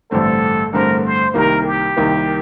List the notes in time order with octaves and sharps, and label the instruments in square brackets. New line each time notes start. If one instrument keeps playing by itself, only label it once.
[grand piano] A1 G2 D3 A3 C4 [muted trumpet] A4
[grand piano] A1 G2 D3 A3 C4 [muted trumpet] A#4
[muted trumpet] C5
[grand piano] C2 C3 D#3 A#3 [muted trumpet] A#4
[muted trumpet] G4
[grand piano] C2 C3 D#3 A#3